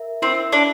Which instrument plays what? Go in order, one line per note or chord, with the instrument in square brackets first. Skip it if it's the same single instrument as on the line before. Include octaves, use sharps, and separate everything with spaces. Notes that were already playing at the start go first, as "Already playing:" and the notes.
Already playing: [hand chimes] A#4 E5
[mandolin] C4 [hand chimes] E4
[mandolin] D4